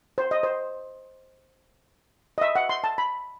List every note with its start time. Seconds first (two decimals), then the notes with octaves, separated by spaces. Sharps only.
0.18 C5
0.31 D#5
0.43 C5
2.38 D#5
2.41 E5
2.56 F#5
2.69 C6
2.84 A5
2.98 B5